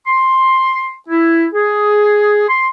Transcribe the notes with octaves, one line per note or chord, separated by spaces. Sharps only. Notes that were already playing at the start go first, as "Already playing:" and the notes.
C6
E4
G#4
C6